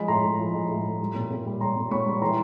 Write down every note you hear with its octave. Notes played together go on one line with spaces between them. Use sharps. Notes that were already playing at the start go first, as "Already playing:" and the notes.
Already playing: F3 G#3 B5
A2 A#5 C6
A2
F3
G#3
A2
A2
G3
A#2
A#2
G3
G3 A#5 C6
A#2
A#2 B5 C#6
G3
E3 A#5 C6